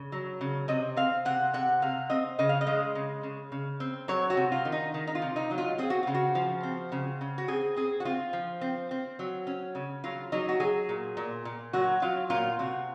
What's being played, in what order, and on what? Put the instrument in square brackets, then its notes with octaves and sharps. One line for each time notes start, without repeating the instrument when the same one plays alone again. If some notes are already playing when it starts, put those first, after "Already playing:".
Already playing: [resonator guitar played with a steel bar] C#3
F#3
C#3
C3 D#5
C4 F5
C3 F#5
C3 F#5
C3 F5
C4 D#5
C#3 D#5
F5
D#5
G#3
C#3
C#3
C#3
C4
F#3 C#5
F#4
C3
F4
D#3
D#4
D#3
D#4
F4
C3
D#4
F#3
F4
C4 G#4
F#4
C#3 F4
F#4
F3
C4
C#3
C#3
F#4
C4 G#4
C4 G#4
F#4
C4 F4
F3
C4
C4
F#3
C#4
C#3
F#3 F4
F#3 D#4
F#4
F#3 G#4
A#2
A#2
A#2
F#3 F#4
F#3 F4
A#2 F4
C3 F#4